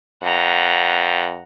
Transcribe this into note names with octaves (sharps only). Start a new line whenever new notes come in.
F2 F#5 A#5